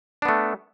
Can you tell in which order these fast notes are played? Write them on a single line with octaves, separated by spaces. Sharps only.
D4 B3 A3